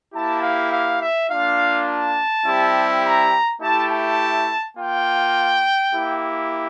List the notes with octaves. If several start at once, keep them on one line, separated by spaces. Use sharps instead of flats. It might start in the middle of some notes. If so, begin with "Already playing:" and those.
A#3 E4 G4 A5
F5
F5
E5
A#3 D4 F4 F5
A5
G3 C4 E4 G4
A#5
A3 E4 G4 A5
A5
A#3 F4 G5
A#3 E4 G4